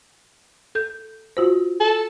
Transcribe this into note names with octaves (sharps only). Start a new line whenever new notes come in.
A4 G6
F4 F#4 C5
A4